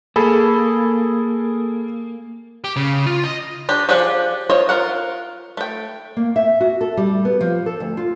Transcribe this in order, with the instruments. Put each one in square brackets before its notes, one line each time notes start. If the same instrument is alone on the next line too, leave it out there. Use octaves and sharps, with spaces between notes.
[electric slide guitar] A#3 [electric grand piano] G#4 A4 B5
[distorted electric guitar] G4
C#3
F4
D#5
[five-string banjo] D4 F#4 G4
F3 G4 G#4 D5 F#5
F4 C5 C#5 D#5
F4 A#4 F#5
A3 G5
[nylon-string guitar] A#3
E5
F#4
A4
G3
B3
F3
A4
D2
F4